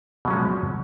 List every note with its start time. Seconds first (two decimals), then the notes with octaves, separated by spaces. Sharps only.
0.25 B2
0.28 F#3
0.30 C#4
0.33 G#3
0.36 F3